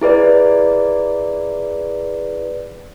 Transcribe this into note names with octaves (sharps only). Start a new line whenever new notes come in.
E4 G#4 B4 D5